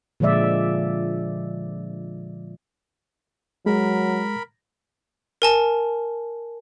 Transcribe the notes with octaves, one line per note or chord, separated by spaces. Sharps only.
A#2 D3 F3 G#3 D5 E5
F#3 G#3 A#4 B5
A#4 G#5 A5